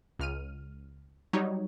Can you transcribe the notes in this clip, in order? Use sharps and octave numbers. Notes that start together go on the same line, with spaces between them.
C#2 F6 D#7
F#3 G3 D#4 C#5